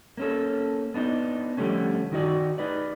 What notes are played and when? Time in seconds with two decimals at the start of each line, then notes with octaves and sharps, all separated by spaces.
0.17 A#3 C#4 A4
0.94 B3 D4 D#4
1.57 D3 F3 G3 A3 C#4
2.12 D#3 D#4 F#4 D5
2.58 D#4 B4 D5